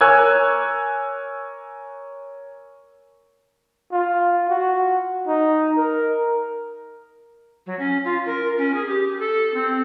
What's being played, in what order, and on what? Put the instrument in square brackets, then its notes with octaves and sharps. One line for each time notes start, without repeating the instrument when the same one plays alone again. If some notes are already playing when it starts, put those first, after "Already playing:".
[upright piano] A#4 C#5 G#5 E6 F#6 G#6
[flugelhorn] F4
F#4
D#4
A#4
[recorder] F#3
C#4
F4
A#4
C#4
G#4
G4
A4
C4